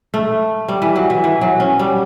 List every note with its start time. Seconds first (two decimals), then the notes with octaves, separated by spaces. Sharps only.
0.14 A3
0.68 G3
0.82 E3
0.96 F#3
1.10 E3
1.24 E3
1.41 F#3
1.60 C#4
1.79 G3